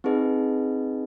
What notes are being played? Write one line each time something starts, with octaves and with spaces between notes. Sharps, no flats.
C4 D#4 G#4 B4 D#5